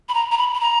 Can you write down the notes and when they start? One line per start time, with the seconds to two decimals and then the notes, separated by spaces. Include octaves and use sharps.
0.09 B5
0.14 A#5
0.32 A#5
0.38 B5
0.54 B5
0.60 A#5